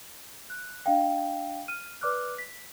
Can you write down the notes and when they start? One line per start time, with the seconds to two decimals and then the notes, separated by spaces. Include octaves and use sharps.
0.50 F#6
0.86 D4 D#5 F5 G5
1.68 F6 D#7
2.01 B4 D5 D6 F6 F#6
2.38 B6